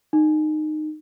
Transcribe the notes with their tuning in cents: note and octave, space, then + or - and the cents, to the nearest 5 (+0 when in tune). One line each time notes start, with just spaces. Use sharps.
D#4 -20